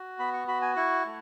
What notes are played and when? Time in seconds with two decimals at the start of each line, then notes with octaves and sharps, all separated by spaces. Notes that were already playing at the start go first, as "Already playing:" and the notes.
Already playing: F#4
0.19 B3 B5
0.34 C#6
0.48 F#4 B5
0.62 G#5
0.76 E4 C#6
1.06 A3